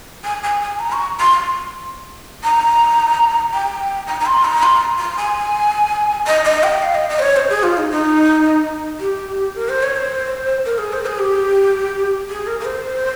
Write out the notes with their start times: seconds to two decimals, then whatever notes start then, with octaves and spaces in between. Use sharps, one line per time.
0.25 G#5
0.43 G#5
0.62 G#5
0.79 A#5
0.92 C#6
1.20 C6
2.44 A#5
3.53 G5
4.07 A#5
4.20 A#5
4.26 C6
4.45 A#5
4.63 C6
4.99 C6
5.17 G#5
6.27 D#5
6.45 D#5
6.63 G5
6.82 F5
6.95 D#5
7.10 D#5
7.19 C5
7.22 C#5
7.36 C5
7.50 G#4
7.63 F4
7.77 D#4
7.91 D#4
9.00 G4
9.55 A#4
9.69 C5
9.83 C#5
9.96 C5
10.65 A#4
10.78 G#4
10.93 C5
11.06 G#4
11.19 G4
12.30 G#4
12.47 A#4
12.60 A#4
12.65 C5